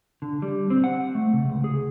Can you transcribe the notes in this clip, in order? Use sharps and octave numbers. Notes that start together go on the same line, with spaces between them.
D3
G3
C4
F#5
A3
C#3
C#2
G#4